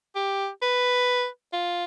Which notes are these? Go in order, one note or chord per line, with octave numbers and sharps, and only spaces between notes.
G4
B4
F4